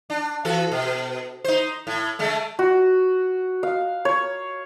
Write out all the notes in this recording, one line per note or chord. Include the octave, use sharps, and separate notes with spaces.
D4
E3 F#4 A4
B2
D#4 C5
A2
D3 G#3 A3
F#4
F5
C#5